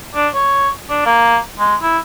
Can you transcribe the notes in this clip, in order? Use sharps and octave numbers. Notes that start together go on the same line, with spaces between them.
D4
C#5
D4
A#3
G#3
E4